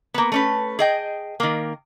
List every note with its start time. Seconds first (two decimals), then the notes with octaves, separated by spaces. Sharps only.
0.14 A#3 B3
0.32 A3 C#4 B4
0.79 G#4 D#5 G5
1.40 D#3 A#3